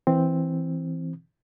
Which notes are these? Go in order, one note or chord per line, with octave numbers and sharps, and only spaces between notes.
E3 C4